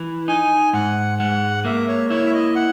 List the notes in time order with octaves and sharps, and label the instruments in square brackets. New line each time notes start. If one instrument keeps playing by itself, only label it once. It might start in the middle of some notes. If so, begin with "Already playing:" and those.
Already playing: [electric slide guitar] E3
[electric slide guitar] D#4 [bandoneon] G#5
[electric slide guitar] G#2 [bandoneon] F#5
[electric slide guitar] G#3 [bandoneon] F#5
[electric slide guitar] A#3 [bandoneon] E5
[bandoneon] C#5
[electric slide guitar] E4 [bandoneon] C#5
[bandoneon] E5
D#5
F#5